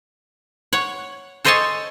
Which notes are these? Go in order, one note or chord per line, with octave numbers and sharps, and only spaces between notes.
C#5 F#5
A4 C5 C#5 D#5 G#5 A5